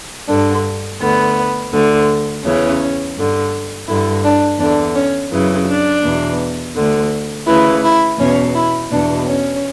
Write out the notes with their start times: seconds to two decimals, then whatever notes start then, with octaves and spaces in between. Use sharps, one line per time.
0.28 G2 D3 D4
1.00 D2 D3 B3
1.72 D2 D3
2.43 E2 C#3 E3 C#4
3.16 G2 D3
3.88 G2 D3 E4
4.24 D4
4.59 E2 D3 D4
4.95 C#4
5.31 F#2 C#3 E3
5.67 D4
6.04 E2 B2
6.75 D2 D3
7.46 D2 C#3 E3 E4
7.83 E4
8.18 E2 B2 C#4
8.54 E4
8.90 E2 B2 D4
9.27 C#4